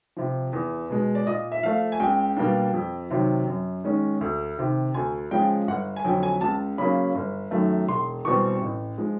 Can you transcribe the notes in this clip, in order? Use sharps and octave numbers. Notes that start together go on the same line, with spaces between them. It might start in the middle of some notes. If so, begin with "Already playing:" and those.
C3 F3
E2
B2 G#3
D5
A#2 D#5
E5
F3 A3 F5
G#5
C#2 G5
B2 G3 A#3 D4
F2
C3 D#3 F#3
F#2
D#3 G#3 C#4
D2
C3 D#3
D2 G#5
C#3 F3 G#3 G5
G1 F#5
G#5
F2 D3 F#3 G5
G#5
C#2 A5
C#3 F#3 A#3 C#4 B5
G1
F#2 D#3 F#3 A3
E1 C6
E2 B2 G3 C4 C#6
A1
F3 G#3